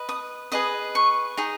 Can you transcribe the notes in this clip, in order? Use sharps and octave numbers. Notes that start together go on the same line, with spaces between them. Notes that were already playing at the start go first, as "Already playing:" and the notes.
Already playing: B4 D#5
D#6
G#4 B4 D#5 D#6
C#6
D#4 G#4